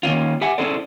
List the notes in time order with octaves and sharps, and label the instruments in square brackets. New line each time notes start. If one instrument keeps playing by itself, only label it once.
[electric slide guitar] D#3 A#3 C#4 F4
G4 E5 F#5 G#5
C#4 E4 G#4 A4 C5 D5